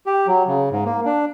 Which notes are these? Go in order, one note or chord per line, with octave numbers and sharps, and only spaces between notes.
G4
F#3
C#3
G#2
A#3
D4